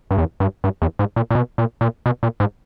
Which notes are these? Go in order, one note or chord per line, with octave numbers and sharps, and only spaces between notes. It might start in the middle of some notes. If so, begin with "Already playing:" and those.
G2
E2
G2
G2
E2
G#2
A#2
A#2
B2
A#2
A#2
B2
A#2
G#2